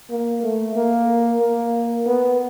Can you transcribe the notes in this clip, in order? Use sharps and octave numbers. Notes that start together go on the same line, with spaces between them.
A#3
A3
A#3
A#3
B3